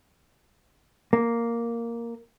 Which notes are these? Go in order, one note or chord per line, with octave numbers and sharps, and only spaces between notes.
A#3